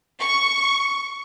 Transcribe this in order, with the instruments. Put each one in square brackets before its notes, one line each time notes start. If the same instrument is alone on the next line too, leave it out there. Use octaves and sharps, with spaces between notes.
[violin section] C#6